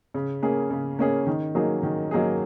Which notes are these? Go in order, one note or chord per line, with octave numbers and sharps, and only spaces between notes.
C#3
A#3 C#4 G#4
C#3
A#3 C#4 G#4
D#3
F#3 A#3 D#4 G#4
D#3
F#3 A#3 D#4 G#4